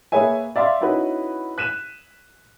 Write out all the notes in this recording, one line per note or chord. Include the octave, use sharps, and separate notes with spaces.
A#3 G#4 B4 C#5 E5 G#5
D5 E5 F5 C6
C#4 D#4 E4 F#4 B4
F#6 B6 D#7 E7